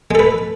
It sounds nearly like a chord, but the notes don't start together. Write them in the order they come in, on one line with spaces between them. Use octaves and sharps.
G#3 A4 B4